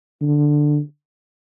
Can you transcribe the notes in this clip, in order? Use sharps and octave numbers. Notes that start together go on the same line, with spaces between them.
D3